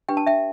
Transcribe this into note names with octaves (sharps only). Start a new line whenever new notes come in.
D4 G4 B4 G5
A5
E5 G5